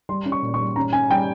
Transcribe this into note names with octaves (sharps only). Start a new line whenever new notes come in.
G3 C6
C#4
C#6
A#2
C#6
G3
C#4 A#5
C#4 G#5
G3 G5